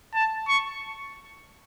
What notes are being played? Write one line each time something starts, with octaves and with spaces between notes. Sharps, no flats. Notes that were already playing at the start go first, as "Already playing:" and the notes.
A5
C#6